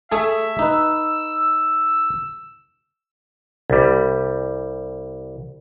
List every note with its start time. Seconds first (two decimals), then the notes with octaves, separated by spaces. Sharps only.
0.11 A3 G#4 A4 E5
0.59 D#4 B4 E6
3.70 C2 G3